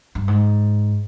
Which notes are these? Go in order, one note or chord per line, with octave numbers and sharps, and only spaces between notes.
G2
G#2